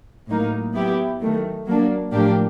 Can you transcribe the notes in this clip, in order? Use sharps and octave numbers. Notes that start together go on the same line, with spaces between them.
A2 F#3 A#3 D#4
F#3 B3 E4 G4
D#3 F#3 A3
F#3 A#3 D4
A2 F3 A#3 D4 G4